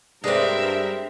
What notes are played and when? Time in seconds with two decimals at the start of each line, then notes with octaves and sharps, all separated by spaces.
0.24 G2 G#3 C4 D4 A#4 B4 D5 E5